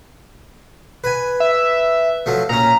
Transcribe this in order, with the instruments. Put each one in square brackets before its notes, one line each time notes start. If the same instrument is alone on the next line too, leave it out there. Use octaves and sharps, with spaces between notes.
[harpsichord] B4 G#5
[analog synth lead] E5
[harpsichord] F3 F#3 A3
[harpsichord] A#2 C#4 [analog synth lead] A#5